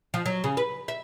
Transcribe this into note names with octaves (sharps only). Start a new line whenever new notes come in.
F3
F#3
C#3
B4
E5